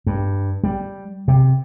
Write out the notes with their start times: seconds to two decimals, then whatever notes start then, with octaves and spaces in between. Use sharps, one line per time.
0.06 G2
0.63 G3
1.28 C3